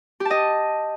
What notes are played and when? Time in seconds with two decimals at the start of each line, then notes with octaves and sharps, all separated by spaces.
0.20 G4
0.25 A5
0.30 D#5